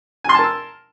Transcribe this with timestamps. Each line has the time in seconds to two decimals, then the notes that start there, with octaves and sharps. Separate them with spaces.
0.24 G#5
0.29 C6
0.34 A5
0.39 A#4
0.43 E6